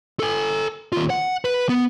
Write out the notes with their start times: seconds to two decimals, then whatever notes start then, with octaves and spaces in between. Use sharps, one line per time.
0.20 A4 G#5
0.93 D#2 F4
1.10 F#5
1.45 B4
1.69 B3